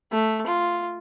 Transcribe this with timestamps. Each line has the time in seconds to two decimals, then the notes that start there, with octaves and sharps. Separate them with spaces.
0.12 A3
0.47 F4